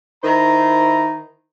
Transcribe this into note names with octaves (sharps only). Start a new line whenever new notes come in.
D#3 E4 C5 A#5